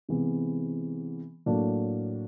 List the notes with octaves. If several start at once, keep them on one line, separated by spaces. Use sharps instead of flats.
C3 E3 G#3 B3
A2 F#3 A#3 D4